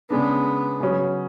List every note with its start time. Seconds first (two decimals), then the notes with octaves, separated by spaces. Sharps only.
0.10 C#3 G#3 B3 D4
0.80 C#3 F#3 C#4 F#4